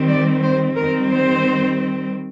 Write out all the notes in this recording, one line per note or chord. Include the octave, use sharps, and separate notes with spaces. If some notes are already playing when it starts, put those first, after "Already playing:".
Already playing: D#3 G3 C4
D5
C5
D#3 G3 C4 A#4
C5